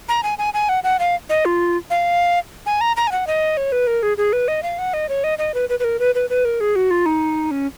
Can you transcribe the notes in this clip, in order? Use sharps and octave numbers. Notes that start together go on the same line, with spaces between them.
A#5
G#5
G#5
G#5
F#5
F#5
F5
D#5
F4
F5
G#5
A#5
A#5
G#5
F#5
D#5
C#5
B4
A#4
G#4
G#4
B4
D#5
F5
F#5
D#5
C#5
D#5
D#5
B4
B4
B4
A#4
B4
B4
B4
A#4
G#4
F#4
F4
D#4
C#4